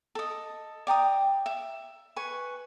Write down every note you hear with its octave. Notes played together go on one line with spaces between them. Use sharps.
A4 D#5
D5 G5 A#5 D#6
E5
B4 G#5 C#6